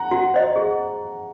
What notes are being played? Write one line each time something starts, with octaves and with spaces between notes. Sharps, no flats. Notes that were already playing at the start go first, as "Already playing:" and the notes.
Already playing: F#5 A#5
F#4
C5 D#5
G#4